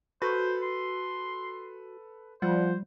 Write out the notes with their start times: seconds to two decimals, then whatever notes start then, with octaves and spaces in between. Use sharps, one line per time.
0.22 F#4 A4 B4 C5
0.62 C6
2.42 F3 G3 C5 F#5